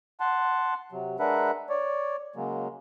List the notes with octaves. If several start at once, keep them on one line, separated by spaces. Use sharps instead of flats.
F#5 A5 C6
C3 F#3
G#3 D4 A#4 B4 E5 F#5
C#5 D5
C#3 F#3 G#3 A#3